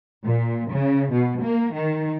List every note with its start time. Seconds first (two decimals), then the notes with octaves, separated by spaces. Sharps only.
0.24 A#2
0.72 C#3
1.12 B2
1.43 A#3
1.75 D#3